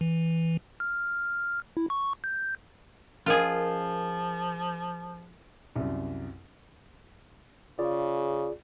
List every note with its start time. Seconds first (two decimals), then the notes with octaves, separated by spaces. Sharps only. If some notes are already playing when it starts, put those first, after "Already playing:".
0.01 E3
0.80 F6
1.77 E4
1.90 C#6
2.24 G6
3.26 F3 C#4 F4 G#4 A#4 D#5
5.76 C2 F#2
7.79 C#3 F4 G#4 D5